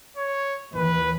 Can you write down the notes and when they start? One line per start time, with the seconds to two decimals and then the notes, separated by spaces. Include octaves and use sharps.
0.17 C#5
0.75 D#2 E3 B4